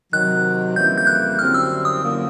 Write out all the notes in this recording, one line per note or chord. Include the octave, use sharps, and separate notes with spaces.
C3 D#3 F#3 F#6
F2 C#3 E3 G3 A#3 G6
G6
F#6
F#2 D3 G3 C4 E4 F6
E6
D#6
F#2 D3 F3 A#3